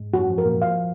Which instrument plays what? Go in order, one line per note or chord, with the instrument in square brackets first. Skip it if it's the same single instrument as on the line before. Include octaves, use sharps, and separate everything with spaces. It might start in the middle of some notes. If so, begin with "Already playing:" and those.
Already playing: [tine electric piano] G#2 G#3
[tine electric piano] F#2 F#3 [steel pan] F#4
[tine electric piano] F3
[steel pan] A#4
[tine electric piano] A#2 A#3
[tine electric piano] F3 [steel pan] F5